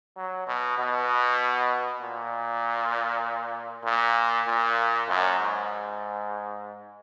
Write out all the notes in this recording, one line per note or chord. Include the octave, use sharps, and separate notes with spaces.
F#3
B2
B2
A#2
A#2
A#2
F#2
G#2